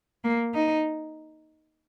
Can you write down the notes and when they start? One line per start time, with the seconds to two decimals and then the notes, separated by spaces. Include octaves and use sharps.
0.24 A#3
0.54 D#4